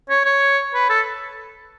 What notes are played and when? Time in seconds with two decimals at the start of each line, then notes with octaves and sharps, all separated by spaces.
0.09 C#5
0.25 C#5
0.74 B4
0.90 A4